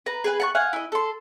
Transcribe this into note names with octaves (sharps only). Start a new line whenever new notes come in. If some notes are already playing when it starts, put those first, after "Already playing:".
B4 A#5
G#4 B4 G#5
F#5 A5 C#6
F5 F#5 G#5
E4 D#5
A4 C6